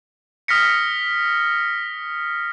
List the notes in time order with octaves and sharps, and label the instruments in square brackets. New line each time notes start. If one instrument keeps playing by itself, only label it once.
[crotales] D#6 F6 A#6 B6 C#7